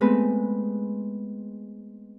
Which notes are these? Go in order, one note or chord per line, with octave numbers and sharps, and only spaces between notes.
G#3 A3 B3 C4 B4